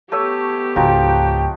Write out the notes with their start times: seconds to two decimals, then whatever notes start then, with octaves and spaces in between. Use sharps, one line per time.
0.12 A3 B3 G4 C#5 E6
0.76 C#2 G#2 F3 D#4 F#4 G5